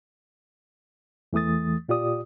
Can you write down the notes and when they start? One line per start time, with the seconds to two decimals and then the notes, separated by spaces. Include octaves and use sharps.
1.33 E2 E3 A3 D#6 A6
1.89 A#2 F4 G4 D5 D#6